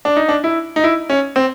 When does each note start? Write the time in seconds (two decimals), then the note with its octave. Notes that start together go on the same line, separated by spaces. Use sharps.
0.05 D4
0.16 D#4
0.29 D4
0.44 E4
0.76 D#4
0.84 E4
1.10 C#4
1.36 C4